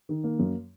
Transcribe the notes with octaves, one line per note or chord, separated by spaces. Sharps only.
D#3
A#3
F#2